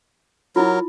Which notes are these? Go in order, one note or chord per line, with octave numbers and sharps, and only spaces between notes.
F#3 E4 F4 A#4